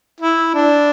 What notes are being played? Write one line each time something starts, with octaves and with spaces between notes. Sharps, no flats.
E4
D4